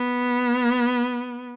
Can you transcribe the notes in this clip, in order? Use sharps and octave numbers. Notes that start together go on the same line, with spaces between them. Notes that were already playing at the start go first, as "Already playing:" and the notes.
Already playing: B3